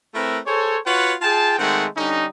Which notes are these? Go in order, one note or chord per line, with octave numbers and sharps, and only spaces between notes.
A3 C4 E4 A#4 B4
G#4 A4 C5 C#5
F4 F#4 B4 C#5 F#5
F4 G#4 G5 A5
D#3 G#3 A3 C4 F#5
D3 G3 C#4 D#4